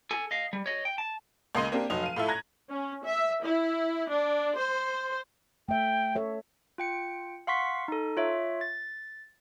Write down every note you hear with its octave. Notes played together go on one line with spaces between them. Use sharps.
A4 G#5
D#5 F5
G3
C#5 D#5
G5
A5
C#2 A#3 D#5 C6 D#7
A#3 C4 D4 G4 A#4
F1 F#3 D#5 F7
F5 D#7
A2 F4 A4 E5
A#5 F#6 G#6 A#6
C#4
E5
E4
D4
C5
A3 E5 G5
A4 C#5 E5
F4 G5 C#7
F5 F#5 C6 C#6 B6
D#4 A4
F4 C#5 E5
A6